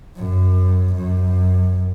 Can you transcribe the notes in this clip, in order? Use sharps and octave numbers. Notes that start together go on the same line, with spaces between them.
F#2
F#2